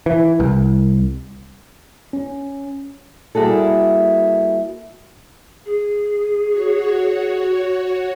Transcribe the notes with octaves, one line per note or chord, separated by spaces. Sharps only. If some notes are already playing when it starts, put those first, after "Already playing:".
E3
C2
C#4
G3 A#3 E4 F#4 G#4 A4
G#4
F#4 C#5